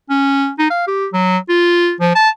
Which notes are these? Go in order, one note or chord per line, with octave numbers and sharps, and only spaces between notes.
C#4
D#4
F5
G4
F#3
F4
F3
A5